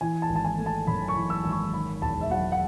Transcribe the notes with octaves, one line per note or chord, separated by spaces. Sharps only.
E3 G#5
A5
G#1
A5
G#5
A3
A5
F#2 B5
C#6
E3
E6
G#1
C#6
D#3 B5
E1 A5
E5
F#3 F#5
F#5